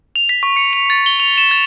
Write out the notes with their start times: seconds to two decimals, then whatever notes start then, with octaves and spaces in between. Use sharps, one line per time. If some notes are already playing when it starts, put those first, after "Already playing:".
0.16 F7
0.29 B6
0.43 C#6
0.56 C#7
0.73 F7
0.90 A6
1.06 G7
1.20 F7
1.38 E7
1.51 A6